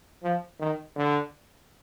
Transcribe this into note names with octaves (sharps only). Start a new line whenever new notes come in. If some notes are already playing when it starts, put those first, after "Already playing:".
F3
D#3
D3